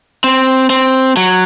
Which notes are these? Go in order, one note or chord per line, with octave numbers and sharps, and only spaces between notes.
C4
C4
F#3